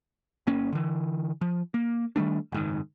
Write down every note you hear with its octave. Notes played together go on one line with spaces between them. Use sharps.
G1 A#3 C#4
D3 E3
F3
A#3
D#3 G3 A3 D4
F#1 G#2 D#3